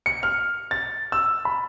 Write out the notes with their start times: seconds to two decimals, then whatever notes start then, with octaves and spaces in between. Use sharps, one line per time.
0.06 C#7
0.23 F6
0.71 A6
1.12 E6
1.45 B5